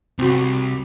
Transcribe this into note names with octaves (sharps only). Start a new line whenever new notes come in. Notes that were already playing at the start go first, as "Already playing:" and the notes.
C2 C4 F#4